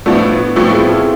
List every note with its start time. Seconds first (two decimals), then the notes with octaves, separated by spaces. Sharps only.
0.06 A2 F3 A3 B3 D4
0.56 A2 F3 A3 C4 E4
0.72 E4 G#4
0.89 F4 A4